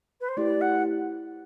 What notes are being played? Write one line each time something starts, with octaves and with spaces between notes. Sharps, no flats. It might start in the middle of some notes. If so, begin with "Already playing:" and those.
B4
C5
A3 E4 G4 B4 D5
F#5